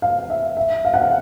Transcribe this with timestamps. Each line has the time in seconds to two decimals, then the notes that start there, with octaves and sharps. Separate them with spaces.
0.02 F5
0.30 E5
0.57 E5
0.85 F5
0.94 F#5
1.02 F5